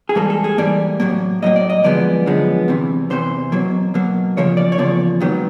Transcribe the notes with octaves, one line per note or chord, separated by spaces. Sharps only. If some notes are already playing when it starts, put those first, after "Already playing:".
G#4
G#2 E3 G3 A#3 A4
A4
G#4
G#2 E3 G3 A#3 D5
A2 F#3 A#3
A2 F#3 A#3 D#5
D5
D#5
F#2 D3 F3 G#3 B3 D5
F#2 D3 F3 G#3 B3
E2 C3 E3
E2 C3 E3 C5
B2 F#3 A#3
B2 F#3 A#3
E2 C#3 F3 A#3 C#5
D5
C#5
E2 C#3 F3 A#3 D5
G#2 D#3 F#3 B3